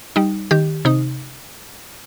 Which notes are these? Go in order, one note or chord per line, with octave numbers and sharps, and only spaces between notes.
G3 D#4
D#3 G4
C3 D#4